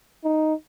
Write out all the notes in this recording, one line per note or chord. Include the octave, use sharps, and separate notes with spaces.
D#4